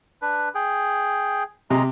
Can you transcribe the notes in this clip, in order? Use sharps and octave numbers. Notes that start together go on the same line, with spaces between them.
D4 B4
G#4 G5
C3 G#3 D#5 A#5